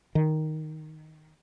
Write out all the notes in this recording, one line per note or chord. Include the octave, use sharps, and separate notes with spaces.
D#3